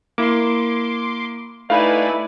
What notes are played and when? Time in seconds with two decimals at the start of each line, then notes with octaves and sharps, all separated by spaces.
0.18 A#3 E4 C6 D6
1.70 A3 D#4 E4 B4 D5 F5 G#5